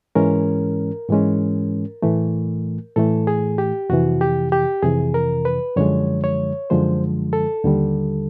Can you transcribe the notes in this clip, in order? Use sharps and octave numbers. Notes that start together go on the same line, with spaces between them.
G#2 E3 G#3 C#4 A#4
G#2 E3 G#3 C#4
A2 E3 A3
A2 E3 A3 A4
G#4
G4
F2 C3 E3 F#4
G4
G4
F2 C3 E3 G#4
A#4
B4
F#2 D3 F3 G#3 C#5
C#5
F#2 D3 F3 G#3 C5
A4
D#2 D3 G3